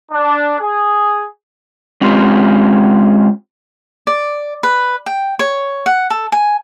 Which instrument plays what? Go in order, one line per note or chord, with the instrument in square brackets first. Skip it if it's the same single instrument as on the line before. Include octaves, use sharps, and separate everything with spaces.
[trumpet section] D4
G#4
[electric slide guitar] G#3 C4 C#4 F4 G4
[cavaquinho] D5
B4
G5
C#5
F#5
A4
G#5